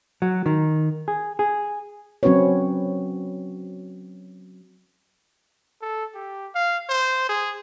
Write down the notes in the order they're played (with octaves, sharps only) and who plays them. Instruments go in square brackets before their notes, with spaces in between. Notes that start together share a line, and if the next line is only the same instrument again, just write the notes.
[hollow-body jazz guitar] F#3
D#3
G#4
G#4
[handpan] F#3 C4 C#4 F#4 B4 C#5
[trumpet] A4
G4
F5
C5
G#4